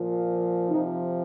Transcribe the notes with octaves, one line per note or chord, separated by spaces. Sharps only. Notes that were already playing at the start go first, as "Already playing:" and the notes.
Already playing: A#2 F3
C3 F3 D#4